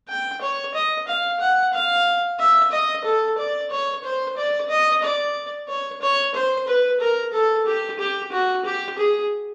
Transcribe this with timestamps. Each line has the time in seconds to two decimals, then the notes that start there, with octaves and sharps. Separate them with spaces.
0.09 G5
0.41 C#5
0.75 D#5
1.07 F5
1.40 F#5
1.74 F5
2.40 E5
2.72 D#5
3.05 A4
3.38 D5
3.71 C#5
4.05 C5
4.37 D5
4.70 D#5
5.03 D5
5.69 C#5
6.02 C#5
6.35 C5
6.68 B4
7.01 A#4
7.34 A4
7.67 G4
7.99 G4
8.32 F#4
8.65 G4
8.98 G#4